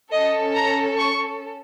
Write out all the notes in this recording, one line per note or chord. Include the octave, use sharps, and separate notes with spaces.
C#4 A4 D#5
A#5
C#6